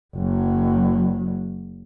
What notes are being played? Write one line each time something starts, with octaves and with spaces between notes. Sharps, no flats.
F#1 F#3